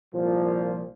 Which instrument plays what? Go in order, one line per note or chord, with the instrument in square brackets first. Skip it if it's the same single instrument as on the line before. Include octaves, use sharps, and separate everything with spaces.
[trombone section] C2 A#2 F3